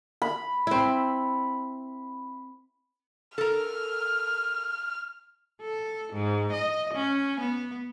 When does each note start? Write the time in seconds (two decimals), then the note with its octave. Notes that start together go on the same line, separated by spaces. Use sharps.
0.22 B5
0.67 C4 E4
3.38 A4 A#4 F6
5.62 A4
6.13 G#2
6.53 D#5
6.94 C#4
7.40 B3